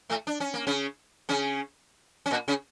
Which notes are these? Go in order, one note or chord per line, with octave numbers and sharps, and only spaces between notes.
A2 A3
D4
C#4
A#3
C#3 C#4
C#3 C#4
C#4
A#2 A#3
C#3 C#4